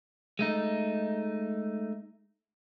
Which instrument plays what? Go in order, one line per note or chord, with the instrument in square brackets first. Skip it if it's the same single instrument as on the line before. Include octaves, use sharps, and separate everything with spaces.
[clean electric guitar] G#3 A3 D#4